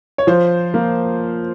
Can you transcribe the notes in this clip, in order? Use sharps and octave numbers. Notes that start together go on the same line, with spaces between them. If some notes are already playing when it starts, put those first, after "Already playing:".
C#5
F3 C5
A#3